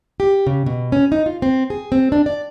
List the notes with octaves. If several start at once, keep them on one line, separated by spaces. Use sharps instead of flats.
G4
C#3
B2
C#4
D#4
F4
C4
G#4
C4
D4
D5